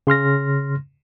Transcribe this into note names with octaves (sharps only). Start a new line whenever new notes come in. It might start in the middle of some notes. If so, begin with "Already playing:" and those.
C#3 C6 F6 A#6